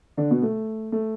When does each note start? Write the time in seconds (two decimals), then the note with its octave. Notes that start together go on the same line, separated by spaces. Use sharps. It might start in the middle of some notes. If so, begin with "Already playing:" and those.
0.17 D3 D4
0.30 B2 B3
0.42 A3
0.92 A3